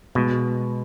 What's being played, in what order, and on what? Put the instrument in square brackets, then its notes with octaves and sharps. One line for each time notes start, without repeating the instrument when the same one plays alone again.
[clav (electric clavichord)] B2 [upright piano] G#3